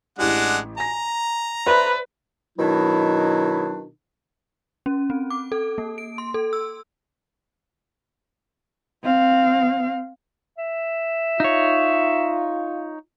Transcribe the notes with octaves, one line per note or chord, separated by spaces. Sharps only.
A1 E3 G#3 D4 G4 F#5
G#5 A#5 A#6
B4 C5 D5 E5
B2 D#3 F#3 D4 E4
C#4
C4
D6
A4
A#3
D7
C6
A4
E6
C4 F5
E5
D#4 F4 C#5